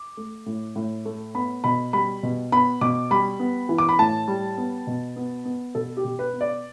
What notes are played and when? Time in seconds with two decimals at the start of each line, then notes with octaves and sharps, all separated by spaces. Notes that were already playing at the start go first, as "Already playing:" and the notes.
Already playing: D6
0.17 A3
0.46 A2
0.76 A2
1.05 A3
1.35 B3 B5
1.64 B2 B5
1.93 G3 B5
2.23 B2
2.52 B3 B5
2.81 B2 D6
3.11 G3 B5
3.40 B3
3.69 E3
3.78 D6
3.89 B5
3.99 A2 A5
4.28 G3
4.58 B3
4.87 B2
5.16 B3
5.45 B3
5.75 B2 A4
5.97 G4
6.04 B2
6.19 B4
6.33 B3
6.41 D5